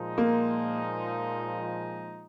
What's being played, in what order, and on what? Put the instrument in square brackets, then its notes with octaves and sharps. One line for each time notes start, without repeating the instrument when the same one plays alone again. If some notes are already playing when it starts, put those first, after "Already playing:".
Already playing: [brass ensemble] A#2 F3 G#3 D#4
[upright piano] A#3